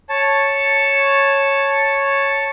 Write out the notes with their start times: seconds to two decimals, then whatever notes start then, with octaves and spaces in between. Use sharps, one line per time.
0.09 C#5 A5